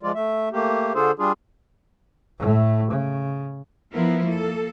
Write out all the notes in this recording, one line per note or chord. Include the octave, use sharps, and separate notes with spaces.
F3 G#3 F4 D5
A3 E5
A3 A#3 G4
D3 D4 F4 G#4 A4 C5
G3 D4 F4 G#4
A2 A3
C#3
F3 B3 E4 A#4
A#3 A4